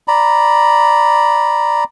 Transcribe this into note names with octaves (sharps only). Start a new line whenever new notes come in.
D5 A#5 B5